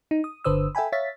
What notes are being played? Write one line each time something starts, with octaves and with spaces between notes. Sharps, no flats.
D#4
D#6
G1 D3 B4 C5 D#6 E6
A4 E5 G5 G#5 B5
C#5 E5 F5 A6 B6